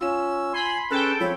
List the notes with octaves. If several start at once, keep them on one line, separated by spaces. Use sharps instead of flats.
C#4 F4 E6 E7
G#5 B5 C6
C#4 G#4 A4 B4 G5
F3 C4 C#5 B5